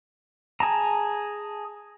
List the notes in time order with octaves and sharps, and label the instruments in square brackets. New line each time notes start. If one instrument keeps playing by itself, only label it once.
[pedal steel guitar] G#4 A5 A#5